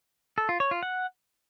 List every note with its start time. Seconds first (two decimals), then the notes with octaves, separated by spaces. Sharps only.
0.38 A4
0.49 F4
0.60 C#5
0.71 F4
0.83 F#5